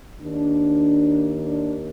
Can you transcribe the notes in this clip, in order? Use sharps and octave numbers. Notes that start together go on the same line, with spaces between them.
D#2 D#3 A#3 D4
D4